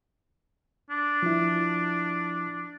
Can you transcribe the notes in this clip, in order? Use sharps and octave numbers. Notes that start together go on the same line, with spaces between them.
D4
F3 E4